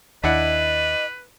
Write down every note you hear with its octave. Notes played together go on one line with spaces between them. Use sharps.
D#2 D4 E4 B4 D#5 F#5